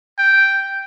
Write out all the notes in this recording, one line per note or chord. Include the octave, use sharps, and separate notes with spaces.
G5